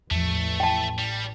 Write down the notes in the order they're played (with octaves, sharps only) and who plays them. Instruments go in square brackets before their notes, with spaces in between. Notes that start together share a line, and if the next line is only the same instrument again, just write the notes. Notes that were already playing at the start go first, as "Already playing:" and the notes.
[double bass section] A1 [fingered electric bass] E2 F3 [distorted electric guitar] A3
[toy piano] G5 A5
[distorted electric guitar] G3